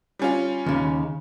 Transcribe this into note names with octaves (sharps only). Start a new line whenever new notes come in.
G3 C#4 F4
D#2 C#3